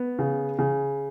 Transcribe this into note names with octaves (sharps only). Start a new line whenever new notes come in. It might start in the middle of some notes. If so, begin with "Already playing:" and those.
Already playing: B3
C#3
C#3